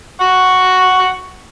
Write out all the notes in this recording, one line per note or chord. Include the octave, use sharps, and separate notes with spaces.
F#5 C#6